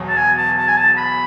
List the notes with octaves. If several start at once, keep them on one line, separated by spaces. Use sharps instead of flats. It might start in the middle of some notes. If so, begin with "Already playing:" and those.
Already playing: E1 E2 B2 F#3
A5
G#5
A5
A5
G#5
A5
B5